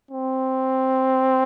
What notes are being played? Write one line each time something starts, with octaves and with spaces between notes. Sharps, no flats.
C4